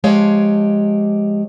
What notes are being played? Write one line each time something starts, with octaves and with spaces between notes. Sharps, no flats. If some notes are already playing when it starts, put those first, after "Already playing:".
F3 G#3 G4 C#5 F5